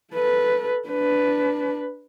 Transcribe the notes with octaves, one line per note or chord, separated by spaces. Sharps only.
A4 B4
D4 B4